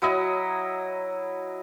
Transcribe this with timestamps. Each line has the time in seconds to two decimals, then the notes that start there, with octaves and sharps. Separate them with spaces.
0.02 F#3 E4 D#5